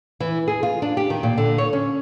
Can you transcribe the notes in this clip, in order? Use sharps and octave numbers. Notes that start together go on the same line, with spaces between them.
E3
G#4
F4
D4
G4
D#3
A#2
D3
C#5
C#4